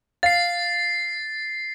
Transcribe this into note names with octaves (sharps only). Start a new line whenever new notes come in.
F5 A6 C7